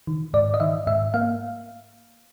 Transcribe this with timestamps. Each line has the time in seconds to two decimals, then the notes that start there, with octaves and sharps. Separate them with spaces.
0.07 D#3
0.34 G#2 D5
0.54 D#5
0.60 D#3 E5
0.87 G#2 E5
1.14 A#3 F5